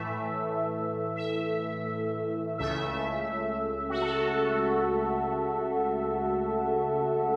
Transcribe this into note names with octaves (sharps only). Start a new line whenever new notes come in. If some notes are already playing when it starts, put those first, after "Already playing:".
Already playing: A2 E3 A3 E5
E5
C#2 C#3 A3 E5
F#4
A4